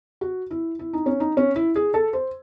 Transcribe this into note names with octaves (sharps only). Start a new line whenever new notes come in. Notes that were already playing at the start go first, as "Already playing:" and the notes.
F#4
E4
E4
D#4
C#4
D#4
C#4
E4
G#4
A4
C5